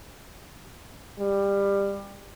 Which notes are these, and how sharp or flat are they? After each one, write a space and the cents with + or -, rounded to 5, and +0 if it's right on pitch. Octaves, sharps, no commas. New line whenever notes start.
G3 +20